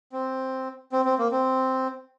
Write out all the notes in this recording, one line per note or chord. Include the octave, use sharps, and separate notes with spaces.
C4
C4
C4
A#3
C4